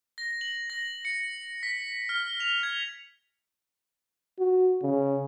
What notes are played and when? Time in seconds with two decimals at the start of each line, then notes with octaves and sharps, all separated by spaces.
0.18 A#6
0.41 F#7
0.70 A#6
1.05 C#7
1.63 B6
2.09 F6
2.40 F7
2.63 G#6
4.39 F#4
4.83 C#3